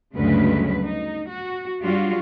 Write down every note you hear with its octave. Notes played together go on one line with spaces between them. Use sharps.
D2 G2 C#3 F#3 G#3 B4
D#4
F#4
G2 F#3 G3 D4 F4 F#4